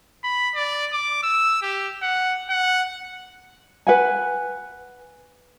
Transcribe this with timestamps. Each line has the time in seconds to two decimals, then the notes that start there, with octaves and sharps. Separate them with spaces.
0.24 B5
0.55 D5
0.93 D6
1.23 E6
1.62 G4
2.02 F#5
2.50 F#5
3.87 B4 F#5 G#5